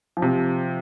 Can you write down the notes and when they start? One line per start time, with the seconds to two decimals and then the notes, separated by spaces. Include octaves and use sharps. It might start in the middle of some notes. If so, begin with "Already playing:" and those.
0.17 F3
0.22 C3